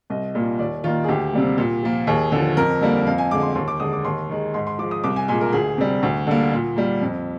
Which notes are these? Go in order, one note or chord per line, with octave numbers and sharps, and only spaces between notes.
C2 D#5
A#2 G3 A#3
D#2 D5
D#3 A#3 F4
G#4
D2 G4
C3 G3 A#3
A#2
F3 A#3
D#2 G#4
D3 F3
F2 A#4
D3 G3 A#3
F2 F5
G#5
D3 G#3 D6
C6
D#2 C6
D6
D3 G#3 D#6
D6
D#2 C6
D#3 G#3
G#2 C6
C6
F3 G#3 D6
D#6
C2 D6
G#5
A#2 G#3 G#5
A#4
D2 G#4
C3 G3
D2
D3 G3 A#3
A#2
G3 A#3
F2